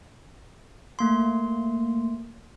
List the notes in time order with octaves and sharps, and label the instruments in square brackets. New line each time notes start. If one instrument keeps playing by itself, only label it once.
[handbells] A3 A#3 C6